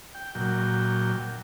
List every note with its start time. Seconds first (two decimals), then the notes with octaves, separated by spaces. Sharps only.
0.15 G5
0.35 A#2 F#3 G5